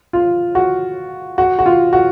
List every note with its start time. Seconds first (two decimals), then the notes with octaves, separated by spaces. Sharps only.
0.13 F4
0.55 F#4
1.38 F#4
1.59 F#4
1.66 F4
1.93 F#4